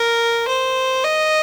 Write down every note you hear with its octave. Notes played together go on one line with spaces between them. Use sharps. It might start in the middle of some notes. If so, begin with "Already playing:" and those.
Already playing: A#4
C5
D#5